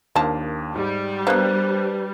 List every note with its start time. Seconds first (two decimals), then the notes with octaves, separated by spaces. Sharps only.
0.16 D#2 F3 A#3 D4 A5
0.75 G#2 G3
1.27 A#3 B3 D4 B4 C5 F#6